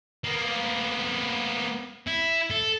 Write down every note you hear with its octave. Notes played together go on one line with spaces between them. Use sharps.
A#3 B3
E4
A4